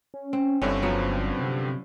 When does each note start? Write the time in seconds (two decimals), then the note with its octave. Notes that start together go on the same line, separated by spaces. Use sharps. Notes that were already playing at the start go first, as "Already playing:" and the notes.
0.14 C#4
0.33 C4
0.62 G1 G2 D3 C4 C#4 E4
0.82 F3 F#3 B3
1.39 C3